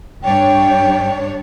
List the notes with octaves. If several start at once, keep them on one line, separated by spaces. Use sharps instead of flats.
G2 G3 D4 C#5 G5